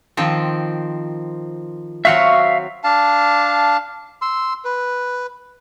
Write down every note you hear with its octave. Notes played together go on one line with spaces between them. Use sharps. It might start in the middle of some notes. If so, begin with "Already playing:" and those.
D#3 F3 C4
F#3 C4 F#4 E5 F5 C#6
D4 F5 A5
C6 E6
B4